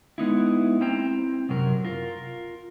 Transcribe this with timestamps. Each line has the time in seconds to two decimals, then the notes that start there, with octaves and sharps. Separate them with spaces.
0.18 G#3 B3 D#4 E4
0.81 C4 E4 C5 G5 A#5
1.49 F#2 C3 F#3 A#4
1.85 F4 A#4